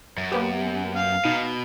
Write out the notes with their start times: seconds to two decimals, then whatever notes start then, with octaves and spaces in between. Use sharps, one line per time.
0.18 F#2
0.32 A#3 B3 G4
0.96 F5
1.25 B2 D#4